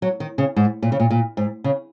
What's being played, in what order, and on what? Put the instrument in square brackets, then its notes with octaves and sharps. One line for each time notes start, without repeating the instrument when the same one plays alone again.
[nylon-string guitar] F#3
D#3
C#3
G#2
A#2
C#3
A#2
A#2
G#2
C#3